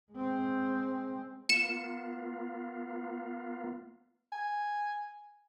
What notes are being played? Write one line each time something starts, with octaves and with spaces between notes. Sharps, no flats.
G#3 C4
A#3 B3 F4 C#7 E7
G#5